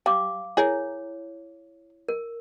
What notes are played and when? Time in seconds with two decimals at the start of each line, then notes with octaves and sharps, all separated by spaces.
0.06 G3 F5 D6
0.57 E4 G#4 A#4 C#5
2.09 A#4